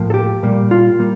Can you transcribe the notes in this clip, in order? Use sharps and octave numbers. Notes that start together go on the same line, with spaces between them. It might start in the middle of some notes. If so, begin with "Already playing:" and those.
Already playing: A2 F3 A#3
A4
G4
A#2 G3 A#3
F4
G3 A#3